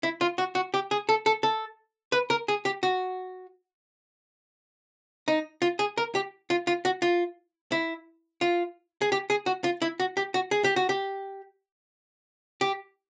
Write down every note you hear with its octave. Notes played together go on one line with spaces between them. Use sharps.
E4
F4
F#4
F#4
G4
G#4
A4
A4
A4
B4
A#4
G#4
G4
F#4
D#4
F4
G#4
A#4
G4
F4
F4
F#4
F4
E4
F4
G#4
G4
G#4
F#4
F4
E4
F#4
G4
F#4
G#4
G4
F#4
G4
G4